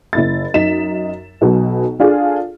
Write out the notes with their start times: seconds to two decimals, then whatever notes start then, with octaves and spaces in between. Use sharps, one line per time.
0.13 F#1 E4 A6
0.54 F#2 D#4 B6 E7
1.41 B1 B2 F#3
2.00 D4 F4 G#4 A4